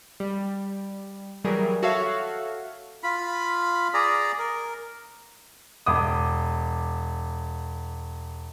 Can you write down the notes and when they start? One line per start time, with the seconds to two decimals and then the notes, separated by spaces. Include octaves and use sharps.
0.20 G3
1.44 E3 F#3 G3 G#4 A#4
1.83 F#4 A4 C#5 E5 F5
3.03 F4 B5
3.94 G#4 D5 A#5
4.38 A#4
5.86 E1 D6 D#6